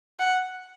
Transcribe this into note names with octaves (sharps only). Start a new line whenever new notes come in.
F#5